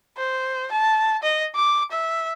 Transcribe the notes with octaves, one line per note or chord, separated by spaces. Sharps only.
C5
A5
D#5
D6
E5